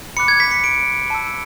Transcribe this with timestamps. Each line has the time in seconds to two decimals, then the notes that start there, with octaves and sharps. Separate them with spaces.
0.17 B5 D6 F#6 C#7
0.28 G#6
0.40 B6
0.51 C#7
0.64 D7
1.10 A5 E6